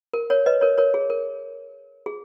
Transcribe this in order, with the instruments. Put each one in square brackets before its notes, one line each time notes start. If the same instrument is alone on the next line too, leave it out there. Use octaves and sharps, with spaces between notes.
[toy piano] A#4
A#4 C#5
B4 D#5
A#4 C#5
A#4 C#5
G#4
A#4
G#4